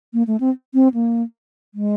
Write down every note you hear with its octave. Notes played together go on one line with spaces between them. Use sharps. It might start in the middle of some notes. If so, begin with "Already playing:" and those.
A#3
A3
C4
C4
A#3
G#3